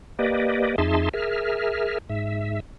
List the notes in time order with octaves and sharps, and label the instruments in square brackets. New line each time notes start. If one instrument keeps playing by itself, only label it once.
[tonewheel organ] A#3 G4 B4 D5 D#5
F2 D#4 G#4 E5 A5 C6
G#4 A#4 E5 F6
G#2 E5